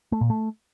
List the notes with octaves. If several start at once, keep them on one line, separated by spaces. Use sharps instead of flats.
A3
A#2
A3